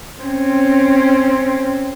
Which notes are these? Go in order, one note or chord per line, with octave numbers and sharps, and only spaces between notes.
C4 C#4